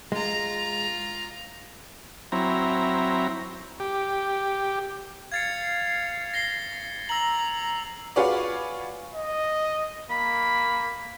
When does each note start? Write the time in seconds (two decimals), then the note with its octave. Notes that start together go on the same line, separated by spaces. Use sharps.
0.12 G#3 F4 A#5
2.32 F#3 C4 E4 A#5
3.80 G4
5.32 F5 G#6 A6 C#7
6.34 A#6 C7 G7
7.09 A#5 E6 F#7
8.16 F4 F#4 G#4 B4 C#5 D5
9.15 D#5
10.11 A#3 B5